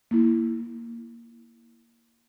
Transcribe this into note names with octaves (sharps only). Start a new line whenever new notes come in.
A#3 E4